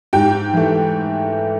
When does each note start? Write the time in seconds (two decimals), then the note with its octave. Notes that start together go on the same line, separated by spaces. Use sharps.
0.13 G#2 G4 G5
0.53 E3 A3